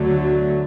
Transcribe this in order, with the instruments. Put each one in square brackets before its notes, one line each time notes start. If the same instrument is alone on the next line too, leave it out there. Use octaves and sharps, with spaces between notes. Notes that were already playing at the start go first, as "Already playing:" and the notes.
Already playing: [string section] D2 D3 F#3 A3